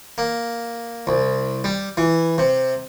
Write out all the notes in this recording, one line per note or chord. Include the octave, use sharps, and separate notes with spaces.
A#3
C2
G3
E3
C3